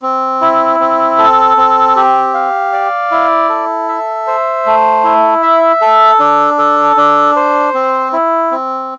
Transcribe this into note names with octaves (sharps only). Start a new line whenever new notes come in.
C4
E4
C4
A4
C4
G4
F5
D5
E4
A4
E5
C5
A3
E4
E5
A4
D4
A4
D4
C5
C4
E4
C4